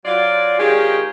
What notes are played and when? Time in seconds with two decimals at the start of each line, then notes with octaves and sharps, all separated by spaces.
0.05 F#3 F4 D5
0.59 D#3 G#3 C#4 F4 G4 G#4